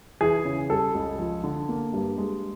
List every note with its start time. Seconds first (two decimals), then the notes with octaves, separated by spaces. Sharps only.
0.21 E3 G#4
0.45 C#3
0.69 G3 A4
0.95 C#2
1.19 F3
1.44 D3
1.69 A#3
1.93 G2
2.18 G#3